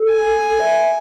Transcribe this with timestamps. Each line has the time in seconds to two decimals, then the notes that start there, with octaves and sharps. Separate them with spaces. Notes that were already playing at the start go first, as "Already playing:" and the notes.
Already playing: A4
0.10 G#5
0.60 E5